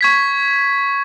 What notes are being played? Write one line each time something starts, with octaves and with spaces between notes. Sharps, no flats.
C#6 G#6 B6